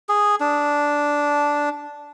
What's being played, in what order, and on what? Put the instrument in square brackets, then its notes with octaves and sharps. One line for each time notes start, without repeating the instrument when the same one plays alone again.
[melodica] G#4
D4